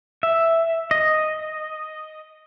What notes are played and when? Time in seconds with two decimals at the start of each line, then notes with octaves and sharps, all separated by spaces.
0.23 E5
0.91 D#5